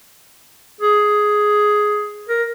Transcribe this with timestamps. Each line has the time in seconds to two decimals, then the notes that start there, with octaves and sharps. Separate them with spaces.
0.81 G#4
2.29 A#4